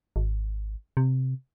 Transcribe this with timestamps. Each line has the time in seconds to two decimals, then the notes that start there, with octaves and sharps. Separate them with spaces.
0.16 G#1
0.97 C3